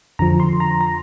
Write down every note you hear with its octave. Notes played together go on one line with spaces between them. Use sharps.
F2 D3 F3 A#5
C6
A#5
A#5